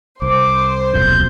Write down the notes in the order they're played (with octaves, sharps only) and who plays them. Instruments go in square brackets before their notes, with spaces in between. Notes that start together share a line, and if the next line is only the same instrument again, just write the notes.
[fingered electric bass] C2 [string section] C5 [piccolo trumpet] D6
[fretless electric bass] D#1 B1 F2 [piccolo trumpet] G6